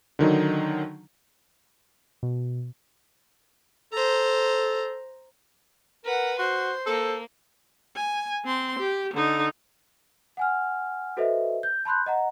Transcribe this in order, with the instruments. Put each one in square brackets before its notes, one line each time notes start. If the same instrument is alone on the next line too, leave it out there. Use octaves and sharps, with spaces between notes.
[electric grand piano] D3 D#3 F#3 D#4
[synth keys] B2
[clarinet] A4 [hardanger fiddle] C5 A#5
[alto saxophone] A#4 [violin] B4 F#5
[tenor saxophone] F#4 [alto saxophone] C5 [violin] C6
[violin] A#3 [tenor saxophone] A4
[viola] G#5
C4 C6
G4
D3 D#4
[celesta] F#5 G#5 F6
F#4 A4 B4 C5 D#5 E5
G6
A5 B5 C6 F#6 G6
D#5 F#5 A#5